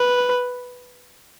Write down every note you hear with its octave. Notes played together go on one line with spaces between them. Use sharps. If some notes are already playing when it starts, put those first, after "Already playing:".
Already playing: B4